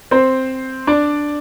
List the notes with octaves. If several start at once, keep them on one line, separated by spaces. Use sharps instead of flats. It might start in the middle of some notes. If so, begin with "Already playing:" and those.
C4 C5
D4 D5